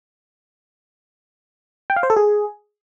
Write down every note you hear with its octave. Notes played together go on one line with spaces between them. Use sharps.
G5
F5
C5
A4
G#4